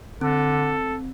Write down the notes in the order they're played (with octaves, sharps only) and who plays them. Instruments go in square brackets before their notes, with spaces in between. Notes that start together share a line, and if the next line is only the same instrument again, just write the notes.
[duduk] D3 [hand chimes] C4 [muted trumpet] A4